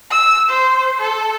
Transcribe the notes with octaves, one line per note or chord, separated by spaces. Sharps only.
E6
C5
A4